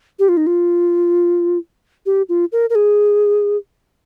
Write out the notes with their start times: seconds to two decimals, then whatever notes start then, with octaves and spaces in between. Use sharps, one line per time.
0.19 G4
0.29 F4
0.37 D#4
0.47 F4
2.06 G4
2.29 F4
2.52 A#4
2.70 A#4
2.75 G#4